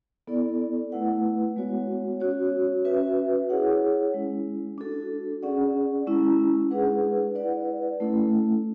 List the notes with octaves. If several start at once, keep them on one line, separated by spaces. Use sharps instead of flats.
B3 E4 A4 D5
A3 E4 B4 F#5
G#3 B3 F#4 C#5 F#5
C#4 F#4 C#5
C#4 F#4 B4 E5
E4 G#4 C#5 F#5
G#3 C#4 E4
D4 F#4 A4
C#4 G#4 D5 F#5
G#3 C#4 E4
G#3 D4 G#4 B4 F#5
E4 B4 D5 F#5
A3 C#4 E4 A4